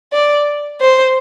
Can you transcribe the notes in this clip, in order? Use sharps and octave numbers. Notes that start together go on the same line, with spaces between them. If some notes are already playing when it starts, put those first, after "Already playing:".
D5
C5